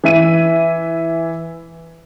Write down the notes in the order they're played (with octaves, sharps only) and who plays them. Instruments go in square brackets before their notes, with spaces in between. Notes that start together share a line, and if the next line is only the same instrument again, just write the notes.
[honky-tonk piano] E3 E5 D#7